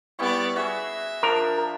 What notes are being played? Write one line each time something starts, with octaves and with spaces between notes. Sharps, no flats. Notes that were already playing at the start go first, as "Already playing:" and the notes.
G3 B3 E4 D5 C#6
F#4 G#4 E5
F3 D4 A#4